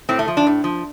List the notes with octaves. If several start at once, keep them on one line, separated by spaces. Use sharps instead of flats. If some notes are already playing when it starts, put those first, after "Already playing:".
A2 C4
A3
F3
D4
A2
F3